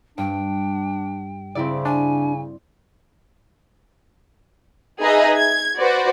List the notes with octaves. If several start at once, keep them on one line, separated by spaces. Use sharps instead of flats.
G2 D4 G5
C#3 C4 E4 D5
D4 G#5
D#4 G#4 B4 D#5 E5
G#6
F#4 B4 C5 D5